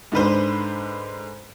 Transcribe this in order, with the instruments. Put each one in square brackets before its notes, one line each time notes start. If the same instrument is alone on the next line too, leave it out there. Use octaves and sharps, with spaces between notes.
[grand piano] G#2 D3 B4 C5